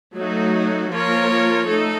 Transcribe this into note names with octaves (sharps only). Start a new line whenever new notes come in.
F#3 A3 D#4 F#4
F3 A#3 F4 A#4 C#5
A3 D#4 A4